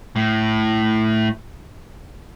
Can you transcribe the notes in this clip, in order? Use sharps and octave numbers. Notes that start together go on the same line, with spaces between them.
A2